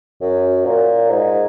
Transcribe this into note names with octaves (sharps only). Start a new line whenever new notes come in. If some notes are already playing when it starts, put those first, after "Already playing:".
F#2
A#2
G#2